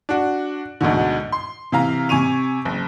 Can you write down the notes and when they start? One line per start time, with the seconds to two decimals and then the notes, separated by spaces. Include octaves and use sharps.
0.09 D4 F#4
0.81 D2 G#2 B2 D3
1.32 C6
1.72 C3 E3 F5 A#5
2.09 C3 G#5 C#6 D#7 F7
2.65 F#1